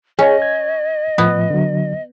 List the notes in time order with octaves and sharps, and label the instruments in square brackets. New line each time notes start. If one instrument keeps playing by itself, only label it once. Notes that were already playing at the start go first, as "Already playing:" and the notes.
[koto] C#4 [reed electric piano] G#4 C#5 [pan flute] D#5
[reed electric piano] G#6
[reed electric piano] A2 F3 [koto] B3
[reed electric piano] D3 F#3